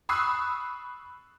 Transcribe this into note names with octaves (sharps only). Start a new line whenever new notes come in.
B5 C#6 D#6 E6 F#6 C7